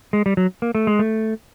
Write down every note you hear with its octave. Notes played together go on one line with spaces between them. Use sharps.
G#3
G3
F#3
A#3
A3
G#3
A3